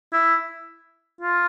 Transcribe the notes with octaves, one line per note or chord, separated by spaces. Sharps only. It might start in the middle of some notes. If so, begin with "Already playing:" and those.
E4
F4